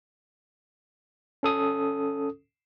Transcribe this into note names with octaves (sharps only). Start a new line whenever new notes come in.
C#4 A4 D#6